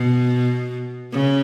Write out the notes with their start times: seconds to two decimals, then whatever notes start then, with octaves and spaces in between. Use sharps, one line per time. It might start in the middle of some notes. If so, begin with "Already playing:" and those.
Already playing: B2
1.12 C#3